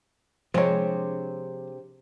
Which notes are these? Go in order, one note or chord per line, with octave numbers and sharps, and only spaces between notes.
C3 F3 G#3 C4 D4 C#5